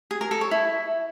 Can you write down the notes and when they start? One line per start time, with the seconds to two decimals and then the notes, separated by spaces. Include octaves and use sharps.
0.11 G#4
0.21 A#4
0.31 A4
0.41 C#5
0.51 E4